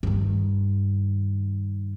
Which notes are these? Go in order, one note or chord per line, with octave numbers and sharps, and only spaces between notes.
G2 D#3